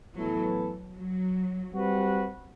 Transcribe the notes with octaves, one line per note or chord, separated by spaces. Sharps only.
A2 E3 F#3 B3 E4 A4
F#3
G3 C4 F#4 B4